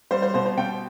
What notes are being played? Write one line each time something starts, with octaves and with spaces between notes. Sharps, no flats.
G3 C5
C5
B2 C5
C5
B2 G5